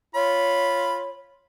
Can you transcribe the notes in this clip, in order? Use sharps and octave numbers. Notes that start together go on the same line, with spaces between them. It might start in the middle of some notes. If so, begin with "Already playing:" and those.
F4 C#5 B5